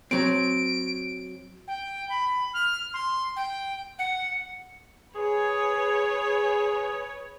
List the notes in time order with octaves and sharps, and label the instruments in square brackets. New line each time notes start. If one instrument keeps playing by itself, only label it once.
[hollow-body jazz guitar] F#3 C4 [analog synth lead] D7
[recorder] G5
B5
F6
C6
G5
F#5
[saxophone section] G#4 [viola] B4 C#5